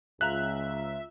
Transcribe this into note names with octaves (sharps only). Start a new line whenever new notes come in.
C#2 F4 E5 A#5 F#6 F7